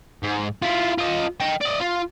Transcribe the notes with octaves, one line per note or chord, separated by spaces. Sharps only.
G#2
E4 F4
F4 D#5
D#5 G5
D5 D#5
F4